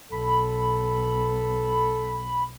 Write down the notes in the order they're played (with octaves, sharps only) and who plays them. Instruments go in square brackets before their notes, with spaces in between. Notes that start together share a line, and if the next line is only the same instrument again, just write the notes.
[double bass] B1 [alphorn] A4 [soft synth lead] B5